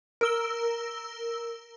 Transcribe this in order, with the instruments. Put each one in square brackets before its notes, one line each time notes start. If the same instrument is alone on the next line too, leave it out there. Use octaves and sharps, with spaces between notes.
[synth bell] A#4 E6 G7